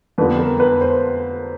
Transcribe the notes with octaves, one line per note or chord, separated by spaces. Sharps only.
F2 D3 G3 B3 B4
A#4
B4
C5